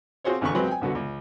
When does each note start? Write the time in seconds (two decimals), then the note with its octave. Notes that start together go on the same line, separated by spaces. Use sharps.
0.24 C4 F4 F#4 G#4 C5 C#5
0.41 A1 E2 D3 B3 B4 C#6
0.55 F#3 G#3 C4 F4 B4
0.67 G5 G#5
0.81 C2 D3 B3 F#4
0.95 C#2